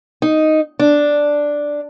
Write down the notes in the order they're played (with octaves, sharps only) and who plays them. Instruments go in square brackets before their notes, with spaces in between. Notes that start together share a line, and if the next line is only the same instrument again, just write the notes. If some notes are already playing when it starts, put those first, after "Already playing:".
[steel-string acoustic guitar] D#4
D4